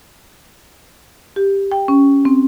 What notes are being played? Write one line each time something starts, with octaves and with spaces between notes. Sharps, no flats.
G4
G5
C#4
C4